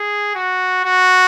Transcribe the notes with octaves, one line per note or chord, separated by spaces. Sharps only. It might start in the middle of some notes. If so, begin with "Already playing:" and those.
Already playing: G#4
F#4
F#4